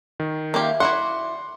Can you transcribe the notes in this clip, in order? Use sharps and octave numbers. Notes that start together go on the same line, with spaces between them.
D#3
A#3 E4 F4 G4
E4 F#4 D5 F#5 C6